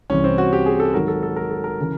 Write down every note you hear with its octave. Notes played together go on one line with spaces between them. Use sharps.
C2 C3 E3 C#4
C4
F#4
G4
G#4
A4
G#2 D#3 F#3 A#4
A4
A4
A#4
A4
A#4
C#3 E3